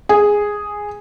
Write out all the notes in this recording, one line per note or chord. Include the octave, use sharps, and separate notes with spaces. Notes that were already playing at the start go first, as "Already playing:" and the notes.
G#4